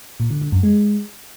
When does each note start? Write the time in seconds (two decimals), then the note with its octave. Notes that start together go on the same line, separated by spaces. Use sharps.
0.20 A#2
0.31 D3
0.41 D3
0.52 F#2
0.63 G#3